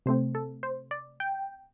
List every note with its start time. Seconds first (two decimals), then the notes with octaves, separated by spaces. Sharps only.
0.06 C3 A3 C4 C5
0.35 A4
0.63 C5
0.91 D5
1.20 G5